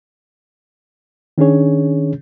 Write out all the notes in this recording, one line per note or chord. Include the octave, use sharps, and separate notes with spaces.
D#3 C#4 D4 G#4 C#5